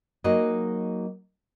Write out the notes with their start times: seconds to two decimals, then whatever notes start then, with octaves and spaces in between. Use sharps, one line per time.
0.24 F#3 A#3 D#4 F#4 G#4 D#5